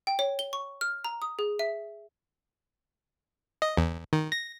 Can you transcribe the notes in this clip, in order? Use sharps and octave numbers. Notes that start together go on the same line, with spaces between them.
G5
C#5
G7
C#6
F6
A#5
D#6
G#4
E5
D#5
E2
D#3
A#6